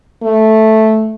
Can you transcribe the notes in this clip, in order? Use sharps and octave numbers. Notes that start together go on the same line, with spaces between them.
A3